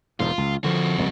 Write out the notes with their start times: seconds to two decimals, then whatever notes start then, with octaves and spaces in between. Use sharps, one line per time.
0.20 E1 D#2 G#2 F4
0.38 C#2
0.64 F2 D3 F3 F#4
0.98 D#1 C2